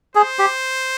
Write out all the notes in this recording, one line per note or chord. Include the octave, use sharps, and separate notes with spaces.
G#4 C5
G4